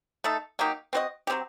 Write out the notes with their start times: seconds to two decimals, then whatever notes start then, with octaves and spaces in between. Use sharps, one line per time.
0.24 A3 D#4 A4
0.59 F#3 A#3 D#4 G4
0.93 C4 F#4 C5 D#5
1.27 F#3 C4 D#4 G4